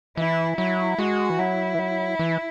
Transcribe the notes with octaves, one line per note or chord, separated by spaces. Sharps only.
E3 E4
F#3 E4
G#3 F#4
E3
F#3 E4
E3
F#3
E3